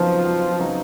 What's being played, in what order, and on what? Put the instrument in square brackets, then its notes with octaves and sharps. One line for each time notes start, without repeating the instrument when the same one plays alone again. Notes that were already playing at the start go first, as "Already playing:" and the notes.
Already playing: [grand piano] F2 C#3 F#3 B3 D#4 [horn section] F3
[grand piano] F2
C#3 F#3 B3 D#4